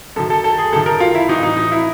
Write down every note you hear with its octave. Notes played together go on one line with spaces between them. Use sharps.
F#2 D#3 A4
A4
A4
G#4
F#2 D#3 A4
A#4
F4
E4
A2 E3 D#4
D#4
D#4
E4